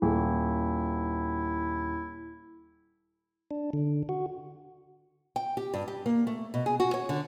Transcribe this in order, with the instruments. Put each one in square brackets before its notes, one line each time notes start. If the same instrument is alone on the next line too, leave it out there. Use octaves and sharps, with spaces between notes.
[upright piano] D#1 [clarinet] E4
[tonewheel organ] D4
D3
F#4
[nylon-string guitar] G5
G4
G2
G4
A#3
A3
B2
G#4
F#4
C#5
D3